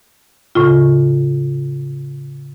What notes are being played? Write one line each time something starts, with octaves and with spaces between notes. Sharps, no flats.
A2 C#3 F4